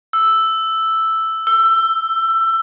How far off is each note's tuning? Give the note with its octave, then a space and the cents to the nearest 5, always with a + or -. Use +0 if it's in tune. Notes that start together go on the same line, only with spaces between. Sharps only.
E6 +0
E6 +20